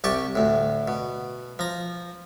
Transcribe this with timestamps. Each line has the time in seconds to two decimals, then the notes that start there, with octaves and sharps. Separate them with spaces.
0.04 C2 G4 A5 C#6
0.35 D2 A2
0.88 B2
1.59 F3 A#5